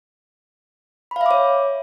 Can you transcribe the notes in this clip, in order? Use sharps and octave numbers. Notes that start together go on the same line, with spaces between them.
C#5 E5 F5 B5 D6